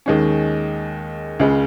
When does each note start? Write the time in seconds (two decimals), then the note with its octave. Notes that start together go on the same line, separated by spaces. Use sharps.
0.06 D#2 D#3 G#3 C#4
1.39 C#2 C#3 G#3